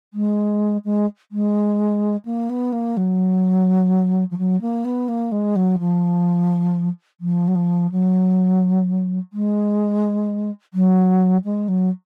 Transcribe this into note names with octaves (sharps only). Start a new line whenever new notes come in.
G#3
G#3
G#3
A#3
B3
A#3
F#3
F3
F#3
A#3
B3
A#3
G#3
F#3
F3
F3
F#3
F3
F#3
G#3
F#3
G#3
F#3